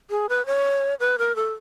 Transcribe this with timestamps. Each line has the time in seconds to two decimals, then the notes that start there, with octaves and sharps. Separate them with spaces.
0.10 G#4
0.29 B4
0.46 C#5
1.00 B4
1.19 A#4
1.36 A4